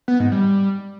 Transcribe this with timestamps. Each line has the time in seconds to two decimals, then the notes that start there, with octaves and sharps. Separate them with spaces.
0.08 B3
0.20 G#2
0.32 G3